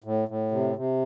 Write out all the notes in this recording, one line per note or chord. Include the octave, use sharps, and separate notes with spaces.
A2
A2
C3
C3